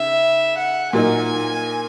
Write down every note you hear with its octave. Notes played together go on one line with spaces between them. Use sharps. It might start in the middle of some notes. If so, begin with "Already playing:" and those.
Already playing: C#3 D#4 E5
F#5
A#2 F#3 A#3 D#4 G#5